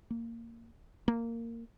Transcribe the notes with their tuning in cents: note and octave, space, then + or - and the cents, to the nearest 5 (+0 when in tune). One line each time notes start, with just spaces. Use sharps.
A#3 -15
A#3 -15